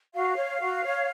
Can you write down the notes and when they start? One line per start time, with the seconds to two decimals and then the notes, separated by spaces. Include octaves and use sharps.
0.13 F#4 F5
0.36 C#5
0.60 F#4
0.83 C#5